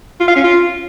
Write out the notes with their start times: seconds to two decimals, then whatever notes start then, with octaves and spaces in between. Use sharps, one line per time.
0.20 F4
0.28 F5
0.36 C#4
0.44 F4